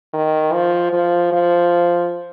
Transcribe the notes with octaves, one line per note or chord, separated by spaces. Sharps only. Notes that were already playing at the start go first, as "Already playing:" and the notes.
D#3
F3
F3
F3